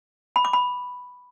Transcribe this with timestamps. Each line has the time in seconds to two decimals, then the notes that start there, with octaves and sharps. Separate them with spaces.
0.36 B5
0.45 D6
0.53 B5